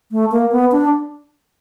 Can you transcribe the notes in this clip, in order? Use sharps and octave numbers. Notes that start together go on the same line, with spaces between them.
A3
A#3
B3
D4